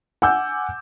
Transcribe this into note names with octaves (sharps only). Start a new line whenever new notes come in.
F#5 G#5 D6 E6 G6